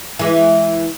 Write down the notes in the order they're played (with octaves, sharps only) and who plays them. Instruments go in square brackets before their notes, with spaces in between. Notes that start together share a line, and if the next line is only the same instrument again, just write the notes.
[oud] E3 G#3